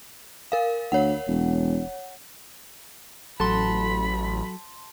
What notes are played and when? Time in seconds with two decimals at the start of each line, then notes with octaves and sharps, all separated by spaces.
0.52 A#4 F5
0.92 D2 C#5 F#5
1.28 E1
3.40 A1 F#3 F#4 A4 A5 B5 C6